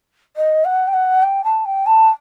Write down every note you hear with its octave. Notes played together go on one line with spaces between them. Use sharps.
D#5
F#5
G5
F#5
G5
A5
G5
A5